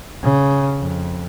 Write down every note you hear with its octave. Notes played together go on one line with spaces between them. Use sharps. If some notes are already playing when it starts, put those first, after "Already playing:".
C#3
F2